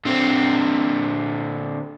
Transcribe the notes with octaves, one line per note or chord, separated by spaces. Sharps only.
D3 C4